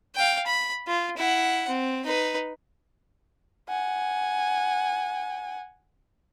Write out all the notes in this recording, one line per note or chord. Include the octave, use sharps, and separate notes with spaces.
F5 G5
B5
F4
E4 F#5
C4
D#4 B4
F#5 G#5